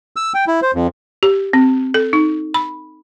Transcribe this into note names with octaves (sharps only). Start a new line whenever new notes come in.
E6
G5
E4
C5
F2
G4
C4
A4
D#4
B5